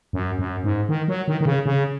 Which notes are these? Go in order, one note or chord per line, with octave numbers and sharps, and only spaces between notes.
F#2
F#2
G#2
D#3
F#3
D#3
D#3
C#3
C#3